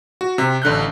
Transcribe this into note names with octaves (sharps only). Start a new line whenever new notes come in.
F#4
C3
A1 D3 F#6 G6